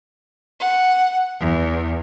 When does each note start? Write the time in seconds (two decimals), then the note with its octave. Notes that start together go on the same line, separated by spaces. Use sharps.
0.60 F#5
1.41 E2